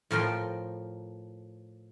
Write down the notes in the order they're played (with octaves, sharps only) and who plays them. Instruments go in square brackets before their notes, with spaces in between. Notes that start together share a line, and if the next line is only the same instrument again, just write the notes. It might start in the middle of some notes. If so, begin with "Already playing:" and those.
[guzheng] A2 F3 A#4 G5 C6